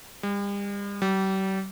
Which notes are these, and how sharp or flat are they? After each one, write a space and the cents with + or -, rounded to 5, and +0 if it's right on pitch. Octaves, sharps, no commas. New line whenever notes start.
G3 +40
G3 -40